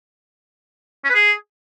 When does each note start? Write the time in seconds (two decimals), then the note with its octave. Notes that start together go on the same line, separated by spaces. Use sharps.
1.04 C#4
1.09 B4
1.15 G#4